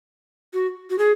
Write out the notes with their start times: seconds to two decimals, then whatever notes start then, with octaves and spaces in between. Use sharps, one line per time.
0.54 F#4
0.90 F#4
0.98 G#4